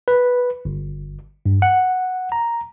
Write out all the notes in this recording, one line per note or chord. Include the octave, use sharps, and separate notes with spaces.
B4
G1
G2
F#5
A#5